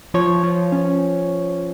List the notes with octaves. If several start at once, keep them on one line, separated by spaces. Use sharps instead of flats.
F3 C#5
F3
C#4